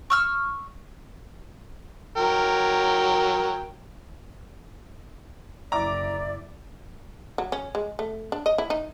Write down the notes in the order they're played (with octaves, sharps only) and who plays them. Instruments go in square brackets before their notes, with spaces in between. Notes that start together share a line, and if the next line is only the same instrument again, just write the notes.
[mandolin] C#6 E6 F6
[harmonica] F#3 A#4 G5
[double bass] F#1 [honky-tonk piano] E4 D6 [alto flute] D5 [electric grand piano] A#5
[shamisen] F#3
C#4
G#3
A3
D4
D#5
E4
D#4